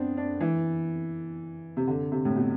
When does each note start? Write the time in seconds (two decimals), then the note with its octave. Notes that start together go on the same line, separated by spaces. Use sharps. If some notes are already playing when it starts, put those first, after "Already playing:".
Already playing: B3 C4 D4
0.17 D4
0.41 E3
1.77 C3
1.88 D3
2.12 C3
2.25 A2
2.36 B2